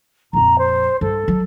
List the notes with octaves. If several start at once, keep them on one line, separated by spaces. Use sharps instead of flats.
A#1 F2 A#5
C5
G2 A4
F#3